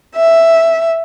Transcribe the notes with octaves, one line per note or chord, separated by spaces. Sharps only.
E5